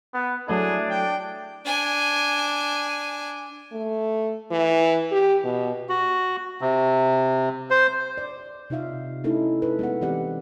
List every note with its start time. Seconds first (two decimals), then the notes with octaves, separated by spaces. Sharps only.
0.14 B3
0.48 F#3 A3 D4 E4 G#4
0.91 G5
1.65 D4 G#5
3.72 A3
4.51 E3
5.12 G4
5.44 B2
5.89 F#4
6.61 C3
7.70 C5
8.18 D5
8.70 C3 D#4 F4 E5 F5
9.24 A3 C#4 D#4 E4 A4 A#4
9.62 A4 B4
9.79 G#3 B3 F#5
10.01 E3 C4 G4 D5 F#5